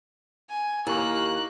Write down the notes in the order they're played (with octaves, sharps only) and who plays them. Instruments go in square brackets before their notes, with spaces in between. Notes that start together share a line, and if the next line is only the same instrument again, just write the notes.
[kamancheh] G#5
[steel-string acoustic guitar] D#2 [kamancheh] A#3 F#6 [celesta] E4 A#4 C#6